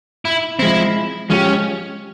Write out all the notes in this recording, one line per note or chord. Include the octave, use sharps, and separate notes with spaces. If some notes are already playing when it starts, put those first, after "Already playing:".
E4
F3 G#3 C4 E4
F3 G#3 C#4 E4 G4